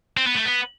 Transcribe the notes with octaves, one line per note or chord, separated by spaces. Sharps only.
C4
B3
A3
B3